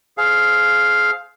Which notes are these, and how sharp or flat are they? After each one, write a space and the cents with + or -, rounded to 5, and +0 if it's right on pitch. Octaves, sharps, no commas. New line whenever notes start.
G#4 +30 C5 +0 F5 +0